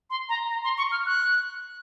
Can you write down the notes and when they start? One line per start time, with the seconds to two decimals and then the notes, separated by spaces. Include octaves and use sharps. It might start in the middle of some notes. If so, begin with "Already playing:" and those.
0.10 C6
0.29 A#5
0.49 A#5
0.64 C6
0.78 C#6
0.92 F6
1.06 F#6